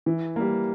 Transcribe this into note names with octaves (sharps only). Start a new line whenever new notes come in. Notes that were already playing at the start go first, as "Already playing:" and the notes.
E3
G3 A#3